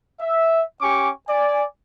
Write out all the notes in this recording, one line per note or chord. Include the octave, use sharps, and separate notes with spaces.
E5
C#4 G4 G#5 C#6 D6
D5 G#5